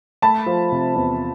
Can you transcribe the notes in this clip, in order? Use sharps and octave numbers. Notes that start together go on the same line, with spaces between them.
A3 A5 B5
F3
C3
E2